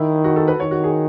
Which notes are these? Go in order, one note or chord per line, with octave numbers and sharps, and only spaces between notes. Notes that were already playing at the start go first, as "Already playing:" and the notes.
Already playing: D#3 E4
F#4
A4
B4
D#3 C#5
F#4
G#4